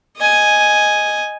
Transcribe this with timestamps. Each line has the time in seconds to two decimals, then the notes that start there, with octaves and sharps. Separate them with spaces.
0.17 D#5 G#5